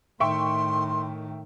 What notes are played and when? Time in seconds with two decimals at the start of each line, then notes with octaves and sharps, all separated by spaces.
0.20 A2 D#3 E5 G5 C6 C#6